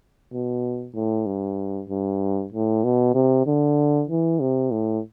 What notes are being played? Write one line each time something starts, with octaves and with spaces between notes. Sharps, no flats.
B2
A2
G2
G2
A2
B2
C3
D3
E3
C3
A2